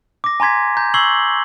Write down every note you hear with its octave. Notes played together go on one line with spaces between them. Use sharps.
D6 A#6
G#5 A#5 C6 G#6 B6
A#5 G6
C#6 E6 G#6 C7 F#7 G7